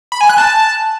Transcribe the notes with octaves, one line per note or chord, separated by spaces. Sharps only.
B5
G#5
F#6
A5